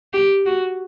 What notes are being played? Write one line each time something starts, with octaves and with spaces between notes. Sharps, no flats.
G4
F#4